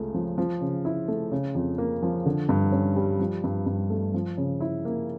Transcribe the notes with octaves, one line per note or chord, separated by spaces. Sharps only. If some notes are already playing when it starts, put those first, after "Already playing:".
Already playing: C#2 C#3 A3
F3
F3
C#3
E4
A3
C#3
F2
A#3
F3
D3
G2
C#4
G3
F3
G2
G2
A3
F3
C#3
E4
A#3